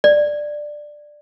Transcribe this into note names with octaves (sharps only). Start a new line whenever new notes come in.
D5